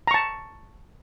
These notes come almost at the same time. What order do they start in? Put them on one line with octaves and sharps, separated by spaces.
A#5 C#6 A5